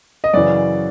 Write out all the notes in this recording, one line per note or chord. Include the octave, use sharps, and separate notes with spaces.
D#5
F#2 C#3 E3 D5